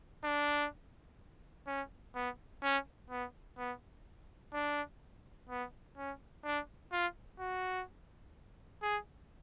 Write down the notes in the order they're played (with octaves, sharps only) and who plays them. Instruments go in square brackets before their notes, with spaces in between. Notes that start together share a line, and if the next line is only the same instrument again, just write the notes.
[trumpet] D4
C#4
B3
C#4
B3
B3
D4
B3
C#4
D4
F4
F#4
G#4